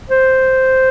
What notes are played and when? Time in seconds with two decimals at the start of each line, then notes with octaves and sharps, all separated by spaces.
0.09 C5